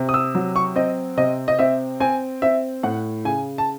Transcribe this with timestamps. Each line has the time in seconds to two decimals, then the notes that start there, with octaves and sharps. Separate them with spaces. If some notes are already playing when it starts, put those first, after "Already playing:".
Already playing: C3
0.09 D#6
0.14 E6
0.35 F#3
0.56 C#6
0.76 C4 D#5
1.17 C3 D#5
1.48 D#5
1.59 C4 E5
2.00 C4 G#5
2.42 C4 E5
2.83 A2 F#5
3.25 C#3 G#5
3.58 A5